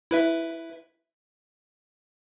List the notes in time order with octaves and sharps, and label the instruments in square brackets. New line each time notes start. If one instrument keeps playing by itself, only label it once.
[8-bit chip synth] E4 B4 E5